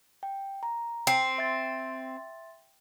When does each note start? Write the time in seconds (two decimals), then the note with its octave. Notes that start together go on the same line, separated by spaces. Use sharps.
0.23 G5
0.63 A#5
1.07 C4
1.38 E5 C6 A6